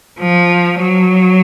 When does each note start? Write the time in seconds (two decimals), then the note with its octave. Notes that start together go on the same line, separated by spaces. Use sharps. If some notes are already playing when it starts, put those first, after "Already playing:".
0.19 F3
0.80 F#3